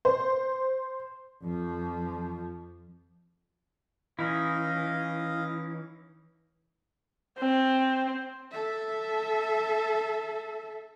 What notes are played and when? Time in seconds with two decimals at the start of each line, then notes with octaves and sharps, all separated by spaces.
0.05 C5
1.43 F2 F3
4.19 E3 C#4 D#4 E4 D#5 F5
7.38 C4
8.51 A4 E5